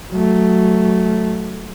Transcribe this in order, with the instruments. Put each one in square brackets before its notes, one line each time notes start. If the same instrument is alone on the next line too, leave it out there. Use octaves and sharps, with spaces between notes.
[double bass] F#3 A3